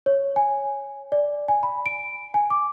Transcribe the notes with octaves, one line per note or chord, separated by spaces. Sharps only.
C#5
G#5
D5
G#5
B5
D7
G#5
D6